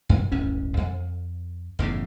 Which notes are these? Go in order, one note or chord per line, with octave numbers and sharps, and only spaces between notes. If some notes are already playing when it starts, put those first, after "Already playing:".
F#2
D1 G1 A2 C#4
F2
F#1 E2 A2 C#3